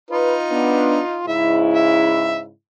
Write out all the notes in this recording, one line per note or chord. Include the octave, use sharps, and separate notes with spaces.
D#4 F4 B4
B3 D4
G#2 C#3 E4 E5
E5